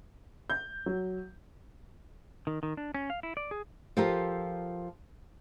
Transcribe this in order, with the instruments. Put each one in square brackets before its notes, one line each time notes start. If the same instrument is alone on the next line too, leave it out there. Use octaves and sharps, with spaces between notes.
[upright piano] G6
F#3
[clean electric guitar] D#3
D#3
D4
C#4
F5
E4
D5
G#4
[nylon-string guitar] F3 F4 G4 A4 A#4